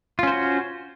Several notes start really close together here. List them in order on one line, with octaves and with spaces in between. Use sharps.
F4 C#4 C5 F#4